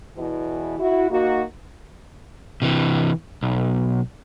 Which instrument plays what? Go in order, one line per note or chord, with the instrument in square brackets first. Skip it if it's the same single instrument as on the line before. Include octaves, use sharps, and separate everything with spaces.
[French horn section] E2 B2 E3
E4 F#4
A#3 D#4 F#4
[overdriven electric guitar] C3 E3
B1